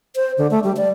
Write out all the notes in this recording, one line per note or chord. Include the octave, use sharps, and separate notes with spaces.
C5
D3
A3
G3
D5